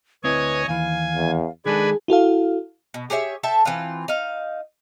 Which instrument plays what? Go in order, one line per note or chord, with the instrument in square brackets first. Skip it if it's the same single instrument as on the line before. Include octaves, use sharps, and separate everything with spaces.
[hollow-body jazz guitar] D2 C4 E4 [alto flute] B4 [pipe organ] C#5 D#5 G#5
[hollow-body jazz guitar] D#2 E3 [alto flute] F5 [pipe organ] G#5
[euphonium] E2
[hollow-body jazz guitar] D#3 G#3 A4 [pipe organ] D4 B4 G#5 [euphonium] G#4
[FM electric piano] E4 F#4 A4 F5
[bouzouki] B2
G4 G#4 C#5 E5
A4 E5 G5 A5
E3 C4 F4
D#4 F5